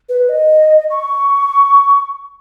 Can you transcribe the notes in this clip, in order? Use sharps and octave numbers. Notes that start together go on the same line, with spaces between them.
B4
D#5
C#6